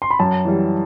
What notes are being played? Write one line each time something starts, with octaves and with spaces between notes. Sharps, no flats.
C6
B5
F#2 A5
E3 G3